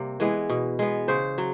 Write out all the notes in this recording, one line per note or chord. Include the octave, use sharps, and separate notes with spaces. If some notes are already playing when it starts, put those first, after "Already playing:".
Already playing: C3 G3 A#3
E3 G#3 B3
B2
G#3 B3
C#3 C5
F#3